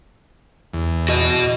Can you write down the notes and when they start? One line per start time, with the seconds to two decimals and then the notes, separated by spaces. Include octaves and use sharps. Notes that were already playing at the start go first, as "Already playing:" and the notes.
0.73 E2
1.09 F#4 D#5